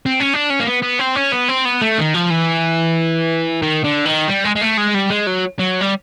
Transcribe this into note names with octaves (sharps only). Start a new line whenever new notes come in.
C4
C#4
D4
C#4
A#3
B3
B3
C4
C#4
B3
C4
B3
A3
D#3
F3
E3
D#3
D3
D#3
G3
G#3
G#3
A3
G#3
G3
G#3
F#3
F#3
G3